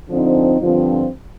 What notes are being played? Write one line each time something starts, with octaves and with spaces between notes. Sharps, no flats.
D3 F3 C4 D#4
G2 D3 F3 C4